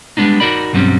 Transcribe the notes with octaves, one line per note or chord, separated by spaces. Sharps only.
G3 G#3 B3 D4 D#4
D#4 F#4 A#4 D5 B5
B1 G2 F#3 G3 C4 C#4